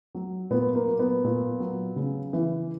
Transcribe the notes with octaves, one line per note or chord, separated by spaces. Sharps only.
F#3
A#2 B3
A#3
F#3
B3
A#2
F#3
C#3
E3